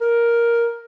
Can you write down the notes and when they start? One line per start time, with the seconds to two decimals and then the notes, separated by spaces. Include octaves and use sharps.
0.01 A#4